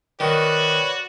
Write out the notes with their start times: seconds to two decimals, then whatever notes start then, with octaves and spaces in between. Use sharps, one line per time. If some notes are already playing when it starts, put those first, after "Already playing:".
0.20 D#3 F#4 B4 C#5 D5